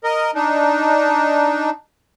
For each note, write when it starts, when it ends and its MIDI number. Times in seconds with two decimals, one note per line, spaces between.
0.04 0.31 70
0.04 0.31 75
0.35 1.70 62
0.35 1.70 63